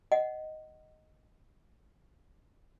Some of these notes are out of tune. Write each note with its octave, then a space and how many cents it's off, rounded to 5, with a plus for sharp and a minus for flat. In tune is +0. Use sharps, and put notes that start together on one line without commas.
D#5 +0 F#5 +20